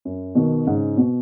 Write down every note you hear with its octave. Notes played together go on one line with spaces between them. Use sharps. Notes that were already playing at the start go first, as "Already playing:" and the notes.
F#2
B2 D#3
G#2 C#3
B2